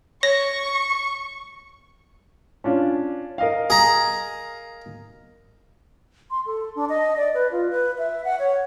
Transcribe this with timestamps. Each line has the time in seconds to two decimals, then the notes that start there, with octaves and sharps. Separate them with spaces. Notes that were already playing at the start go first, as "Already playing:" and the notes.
0.23 C#5 C#6 A#6
2.64 C#4 D4 F4
3.38 A#4 D#5 F5
3.70 G#4 A#5
6.31 C6
6.46 A4
6.76 D4
6.89 D#5
7.17 D5
7.34 B4
7.52 F4
7.70 B4
7.98 E5
8.25 F#5
8.39 C#5